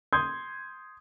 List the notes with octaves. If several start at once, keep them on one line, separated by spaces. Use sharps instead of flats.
C6 D#6 G6 G#6